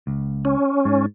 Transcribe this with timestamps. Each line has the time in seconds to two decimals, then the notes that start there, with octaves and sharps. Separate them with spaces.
0.07 C#2
0.45 C#4
0.85 G#2